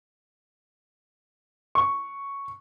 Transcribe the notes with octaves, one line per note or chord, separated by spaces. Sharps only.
C#6